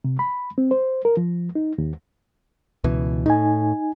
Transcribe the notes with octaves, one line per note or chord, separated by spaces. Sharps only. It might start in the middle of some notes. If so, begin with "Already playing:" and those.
C3
B5
C4
C5
A#4
F3
D#4
D#2
C#2 B2 E3
A2 D#4 G#5